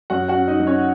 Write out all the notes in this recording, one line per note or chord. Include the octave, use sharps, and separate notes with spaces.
F#2 F#4 F#5
F#4 F#5
C#4
D#4 D#5
F#3
C#4 C#5